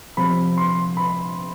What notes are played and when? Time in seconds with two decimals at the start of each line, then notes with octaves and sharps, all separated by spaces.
0.17 C3 F3 B5
0.58 C6
0.97 B5